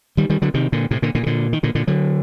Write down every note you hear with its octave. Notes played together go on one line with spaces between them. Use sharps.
D#3 G3
D#3 G3
D3 F#3
C3 D#3
A#2 D3
A2 C3
A#2 D3
A#2 D3
C3
A#2 D3
D#3
A#2 D3
A#2 D3
D3 F#3